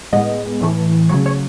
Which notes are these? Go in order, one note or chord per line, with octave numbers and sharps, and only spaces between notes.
A2 G#3 B3 D#5
A2 E3 A3
C#3 F#3 A3 C#5
C#5